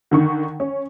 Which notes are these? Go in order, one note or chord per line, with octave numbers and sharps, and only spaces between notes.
D3 D#3 C#6
C#4